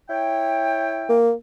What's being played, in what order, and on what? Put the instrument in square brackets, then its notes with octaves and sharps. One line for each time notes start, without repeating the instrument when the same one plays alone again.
[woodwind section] E4 C#5 G5
[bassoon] A#3